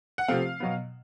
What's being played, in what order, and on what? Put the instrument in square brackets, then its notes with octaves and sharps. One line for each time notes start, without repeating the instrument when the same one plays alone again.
[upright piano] F#5
C3 F3 A3 C4 F5
B2 F#3 B3